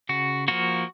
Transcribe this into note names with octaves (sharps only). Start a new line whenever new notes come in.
C#3 F#4
F3 A#3 F#4